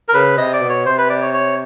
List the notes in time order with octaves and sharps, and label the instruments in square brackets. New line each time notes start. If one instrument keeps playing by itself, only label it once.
[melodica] A#4
[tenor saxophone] C#3 [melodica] B4
[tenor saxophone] C3 [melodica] D#5
[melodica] D5
[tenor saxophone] B2
[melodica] C#5
[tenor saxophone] C3 [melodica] C5
[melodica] B4
D5
C#5
C#5